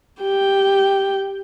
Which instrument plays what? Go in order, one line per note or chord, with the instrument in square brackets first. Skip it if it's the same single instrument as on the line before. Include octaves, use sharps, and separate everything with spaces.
[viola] G4 G5